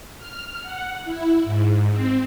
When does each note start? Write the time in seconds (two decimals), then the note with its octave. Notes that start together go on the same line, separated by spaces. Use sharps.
0.18 F6
0.62 F#5
1.04 E4
1.44 G#2
1.91 C4